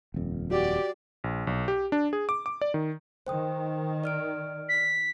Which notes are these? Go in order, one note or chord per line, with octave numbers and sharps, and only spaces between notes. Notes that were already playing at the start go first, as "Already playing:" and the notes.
D#1 F2
F#4 G4 D5
A#1
B1
G4
D4
G#4
D6
D6
D5
D#3
D#3 C5 G5 D#6
D5 F6 D7
B6